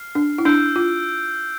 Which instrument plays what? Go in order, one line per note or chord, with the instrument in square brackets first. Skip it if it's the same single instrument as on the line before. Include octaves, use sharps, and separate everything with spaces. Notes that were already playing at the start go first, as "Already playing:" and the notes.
Already playing: [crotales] F6 C7
[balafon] D4
E4
[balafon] D4 [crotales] E6 G6 D7
[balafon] F4